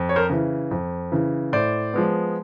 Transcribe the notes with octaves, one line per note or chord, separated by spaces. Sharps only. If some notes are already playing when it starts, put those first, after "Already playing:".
Already playing: F2
C#5
A#4 C5
C#3 E3
F2
C#3 E3
A2 C5 D5
F3 G#3 B3